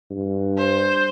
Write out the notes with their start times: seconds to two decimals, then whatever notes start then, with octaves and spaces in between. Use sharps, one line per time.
0.11 G2
0.58 C5